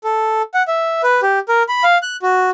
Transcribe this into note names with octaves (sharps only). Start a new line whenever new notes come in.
A4
F#5
E5
B4
G4
A#4
B5
F5
F#6
F#4